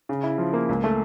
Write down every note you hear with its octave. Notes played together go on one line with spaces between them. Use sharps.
C#3
E4
F3
A#3
C#2
A3